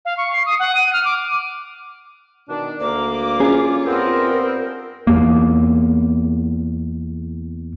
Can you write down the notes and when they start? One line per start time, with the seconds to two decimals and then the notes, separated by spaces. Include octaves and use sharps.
0.05 F5
0.17 C#6
0.33 C7
0.46 D#6
0.59 F#5
0.75 D#7
0.93 F6
1.05 D6
2.49 B2 D#3 D4
2.81 D2 A#3 D6
3.40 C#4 F4 G#4
3.86 G2 B3 C4 A#4
5.07 E2 A#3